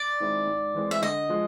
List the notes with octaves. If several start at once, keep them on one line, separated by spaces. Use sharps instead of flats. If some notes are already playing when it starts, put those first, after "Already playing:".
Already playing: D5
D#3 G#3 C4 E4
G#2
E3 G#3 C4
E5
D3 D#5
F3 G#3